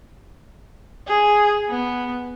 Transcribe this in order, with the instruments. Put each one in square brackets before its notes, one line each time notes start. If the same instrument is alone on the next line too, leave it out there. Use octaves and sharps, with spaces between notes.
[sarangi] G#4
B3